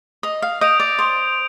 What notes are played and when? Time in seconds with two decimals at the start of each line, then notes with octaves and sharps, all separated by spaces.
0.23 D#5 D#6
0.42 F5
0.61 D#5 G6 D7 F7
0.80 D5
0.99 C5 D#6